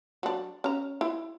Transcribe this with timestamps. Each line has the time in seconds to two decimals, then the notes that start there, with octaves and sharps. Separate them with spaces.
0.23 F#3 D4
0.64 C#4 A#5
1.01 E4